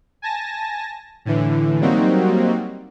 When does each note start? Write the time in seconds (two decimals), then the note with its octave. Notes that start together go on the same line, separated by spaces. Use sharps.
0.22 G#5 A5 A#6
1.25 A2 D3 E3
1.81 F#3 G3 A#3 C4 D#4 F#4